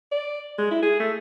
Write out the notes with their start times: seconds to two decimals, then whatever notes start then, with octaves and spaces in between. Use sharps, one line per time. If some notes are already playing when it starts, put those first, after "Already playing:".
0.12 D5
0.58 G#3
0.71 E4
0.83 G#4
1.00 A3